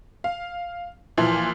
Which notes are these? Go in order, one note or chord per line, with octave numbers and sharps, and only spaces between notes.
F5
A#2 E3 F3